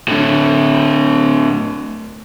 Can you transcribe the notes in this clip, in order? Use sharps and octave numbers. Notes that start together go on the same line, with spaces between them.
A2 D3